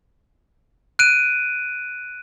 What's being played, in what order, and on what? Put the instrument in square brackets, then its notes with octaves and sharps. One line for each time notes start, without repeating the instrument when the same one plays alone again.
[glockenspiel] F#6 D7 D#7